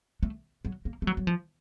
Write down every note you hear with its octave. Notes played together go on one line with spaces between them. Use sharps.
A3
F#3
A#3
A3
F#3
F#3
F3